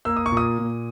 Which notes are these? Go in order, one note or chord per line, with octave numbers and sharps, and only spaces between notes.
A#3 E6
D#6
C#6
A#2
D#6
A#2